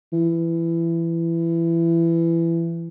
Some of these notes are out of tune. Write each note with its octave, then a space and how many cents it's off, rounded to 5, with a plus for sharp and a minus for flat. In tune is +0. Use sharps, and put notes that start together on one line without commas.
E3 +20